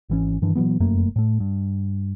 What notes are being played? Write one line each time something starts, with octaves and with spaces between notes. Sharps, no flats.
G#1 E3 C#4
G2 D#3 E3 D4
A#2 E3 F#3 B3
F1 F#2 A3 A#3
A2 A3
G2